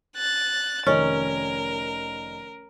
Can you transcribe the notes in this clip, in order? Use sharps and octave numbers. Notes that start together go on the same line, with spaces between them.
F#6 A6
F1 D#3 C#4 D#4 A#4